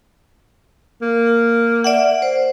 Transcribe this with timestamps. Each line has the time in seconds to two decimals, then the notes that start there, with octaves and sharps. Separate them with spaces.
1.01 A#3
1.84 D5 E5 F#5
2.22 C5